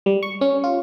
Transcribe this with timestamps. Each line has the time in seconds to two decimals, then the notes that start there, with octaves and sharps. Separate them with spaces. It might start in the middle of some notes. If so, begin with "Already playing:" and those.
0.06 G3
0.23 C#6
0.41 C#4
0.64 F4